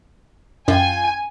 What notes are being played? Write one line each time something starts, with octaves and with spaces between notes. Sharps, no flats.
F#2 F4 G5 G#5